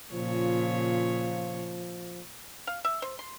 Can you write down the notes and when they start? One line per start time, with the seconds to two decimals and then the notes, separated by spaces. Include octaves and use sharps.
0.13 A#2 C#3 F3 F4 C#5
2.67 F5
2.85 E5
3.02 C5
3.19 C6